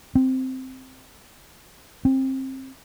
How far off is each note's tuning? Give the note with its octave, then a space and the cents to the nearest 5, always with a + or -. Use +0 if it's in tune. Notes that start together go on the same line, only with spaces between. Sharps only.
C4 -5
C4 +25